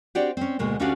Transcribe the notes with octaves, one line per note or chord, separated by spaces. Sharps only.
C4 D4 F#4 G4 D5
C4 C#4
D2 B2 G#3 A#3
D2 C#4 D4 F#4 G4 F5